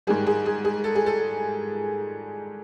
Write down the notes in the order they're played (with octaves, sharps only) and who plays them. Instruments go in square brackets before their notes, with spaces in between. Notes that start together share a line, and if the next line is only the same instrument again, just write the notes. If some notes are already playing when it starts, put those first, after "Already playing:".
[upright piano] G#2 D#3 G3 G#4
G#4
G#4
G#4
A4
G#4
A4